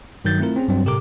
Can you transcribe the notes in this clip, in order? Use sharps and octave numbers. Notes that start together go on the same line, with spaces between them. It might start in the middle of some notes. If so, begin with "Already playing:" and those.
G2 D#3 F#3 G6 A6
A3 C4 E4 F4 A#4
C4 C#4 G#4
G2 F#3 C4
A2 C3 G4 A4 A#4 D6